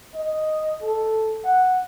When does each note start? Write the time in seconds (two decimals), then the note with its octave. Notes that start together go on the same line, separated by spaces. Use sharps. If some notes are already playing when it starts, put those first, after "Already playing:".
0.15 D#5
0.82 A4
1.44 F#5